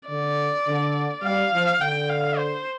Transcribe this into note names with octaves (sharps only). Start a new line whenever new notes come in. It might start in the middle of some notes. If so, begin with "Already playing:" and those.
D3 D5
D3
G3 F5
F3
D3 G5
F5
C5